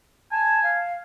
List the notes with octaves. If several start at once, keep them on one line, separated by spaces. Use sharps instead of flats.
G#5 A5
F5